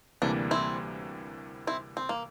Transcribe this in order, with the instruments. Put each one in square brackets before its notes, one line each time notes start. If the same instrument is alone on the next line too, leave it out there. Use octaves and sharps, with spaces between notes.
[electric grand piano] D2 C3 E3 G3 A#3 [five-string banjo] D4
[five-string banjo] C4 E4
C4 E4
C4
A#3